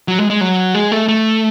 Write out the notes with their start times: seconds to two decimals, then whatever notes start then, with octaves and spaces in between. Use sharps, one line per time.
0.08 F#3
0.19 G#3
0.30 G#3
0.41 F#3
0.75 G#3
0.92 A3
1.08 A3